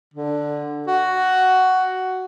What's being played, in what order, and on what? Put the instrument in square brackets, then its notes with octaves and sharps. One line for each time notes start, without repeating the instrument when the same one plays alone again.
[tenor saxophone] D3
F#4